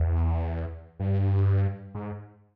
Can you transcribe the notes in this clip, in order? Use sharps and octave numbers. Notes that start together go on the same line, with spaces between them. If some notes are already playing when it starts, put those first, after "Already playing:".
Already playing: E2
G2
G#2